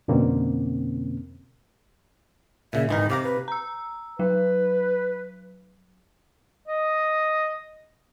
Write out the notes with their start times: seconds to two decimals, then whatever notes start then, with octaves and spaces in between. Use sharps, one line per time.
0.08 F2 B2 D3 A#3 C4 C#4
2.73 A#2 C#3 E5
2.89 G#1 E3 D#4 A#4
3.10 C3 F5 A#5 D6
3.24 B4
3.48 A#5 E6
4.19 F#3 B4
6.68 D#5